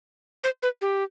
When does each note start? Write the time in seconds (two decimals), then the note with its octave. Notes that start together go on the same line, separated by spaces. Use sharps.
0.44 C5
0.63 B4
0.81 G4